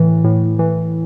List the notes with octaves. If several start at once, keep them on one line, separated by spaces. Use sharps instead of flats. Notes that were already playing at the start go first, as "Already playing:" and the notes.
Already playing: A2 E3
A2
E3